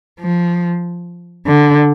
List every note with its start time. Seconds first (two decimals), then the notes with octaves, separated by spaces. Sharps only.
0.20 F3
1.47 D3